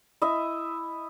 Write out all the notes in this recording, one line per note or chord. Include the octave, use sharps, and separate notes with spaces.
E4 D#5 E5